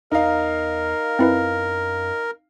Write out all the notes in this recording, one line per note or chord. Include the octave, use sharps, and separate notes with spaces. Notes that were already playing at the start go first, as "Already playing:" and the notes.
E2 D#4 A#4 F5
F#2 C4 E4 B4